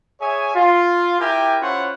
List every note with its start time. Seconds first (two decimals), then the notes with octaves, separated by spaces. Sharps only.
0.21 G#4 C#5 E5 G#5
0.54 F4
1.20 E4 G4 A#4 E5 G5 G#5
1.61 C#4 E4 F4 C5 C#5 F#5